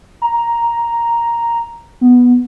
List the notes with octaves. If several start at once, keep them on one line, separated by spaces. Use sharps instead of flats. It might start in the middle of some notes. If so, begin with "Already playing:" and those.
A#5
B3